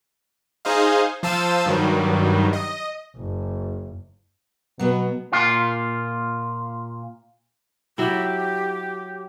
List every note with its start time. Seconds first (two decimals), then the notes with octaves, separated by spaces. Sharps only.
0.65 D#4 G#4 C5 D#5 F5
1.23 F3 C5 F5 A5 E6 D#7
1.66 G2 D#3 F#3 G3
2.53 D#5
3.16 F#1
4.79 B2 F#3 B3
5.33 A#2 F4
7.98 F#3 E4 G4